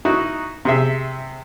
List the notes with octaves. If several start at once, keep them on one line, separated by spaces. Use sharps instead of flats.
D#4 E4 F#4
C3 G#4 E5